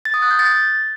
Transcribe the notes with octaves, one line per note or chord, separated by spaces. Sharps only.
A6
D#6
F#6
G6
A6